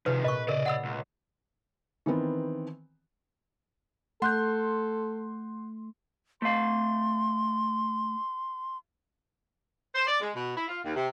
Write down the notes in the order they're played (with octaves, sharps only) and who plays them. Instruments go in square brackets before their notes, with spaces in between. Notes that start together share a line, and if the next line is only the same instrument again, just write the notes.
[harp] C3 C4 G#4 [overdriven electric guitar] D#3 F3 [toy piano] B4
[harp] A#2 [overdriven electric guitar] B4 [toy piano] D#5 C#6
[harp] C#3 [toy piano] A#4 [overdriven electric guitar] D5 D#5
[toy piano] F#5 B5 E6
[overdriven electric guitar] C#2
[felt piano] D#3 E3 B3 C4
[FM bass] A3 [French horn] A4 [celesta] F#5 F#6 G6 [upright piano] C6
[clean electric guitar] A3 F5 [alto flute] C6
[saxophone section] C5
D5
G#3
B2
E4
F4
D#2
C3